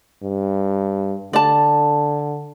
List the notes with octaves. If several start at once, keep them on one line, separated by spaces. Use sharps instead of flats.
G2
D3 D5 A5